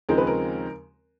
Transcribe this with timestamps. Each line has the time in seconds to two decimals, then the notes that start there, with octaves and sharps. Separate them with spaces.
0.09 D#2 C#3 F3 G#3 C4 A#4
0.18 B4
0.27 A#4